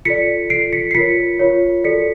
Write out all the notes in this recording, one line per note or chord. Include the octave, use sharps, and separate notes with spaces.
F4 A4 D5 B6 C#7
F4 A4 D5 C7 D7
B6 C#7
C7
F4 A#4 C#5 B6 C#7
F4 A#4 C#5
F#4 A4 D5 B6 C#7